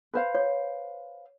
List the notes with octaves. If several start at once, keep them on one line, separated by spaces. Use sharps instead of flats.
B4 C5 F5
C#5